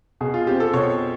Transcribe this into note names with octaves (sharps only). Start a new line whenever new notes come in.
B2 G#4
F4
C4 G4
A4
B2 C#5